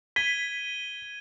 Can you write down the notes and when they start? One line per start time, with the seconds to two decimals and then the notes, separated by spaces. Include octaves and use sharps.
0.16 G#6 B6 D#7 G7